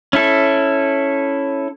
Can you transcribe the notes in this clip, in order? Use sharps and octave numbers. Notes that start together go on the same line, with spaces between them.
C#4 E4 A4